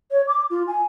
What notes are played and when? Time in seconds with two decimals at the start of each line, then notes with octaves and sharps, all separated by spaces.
0.11 C#5
0.27 D6
0.50 F4
0.67 G#5